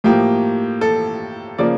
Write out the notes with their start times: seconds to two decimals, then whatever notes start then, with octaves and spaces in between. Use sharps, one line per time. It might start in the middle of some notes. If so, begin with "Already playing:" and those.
0.04 A2 F3 A#3 G4
0.81 A4
1.58 C#3 F3 A#3 D5